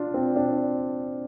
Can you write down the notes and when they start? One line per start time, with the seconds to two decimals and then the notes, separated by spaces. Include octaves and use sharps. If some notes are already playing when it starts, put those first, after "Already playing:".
Already playing: D4 F4
0.14 C4
0.36 D4